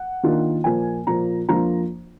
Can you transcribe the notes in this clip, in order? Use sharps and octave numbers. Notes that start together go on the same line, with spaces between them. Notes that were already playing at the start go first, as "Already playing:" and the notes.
Already playing: F#5
D#3 A#3 D4 F4
A#2 F3 A#3 G#5
A#2 F3 A#3 A#5
F2 F3 A#3 D4 F4 A#5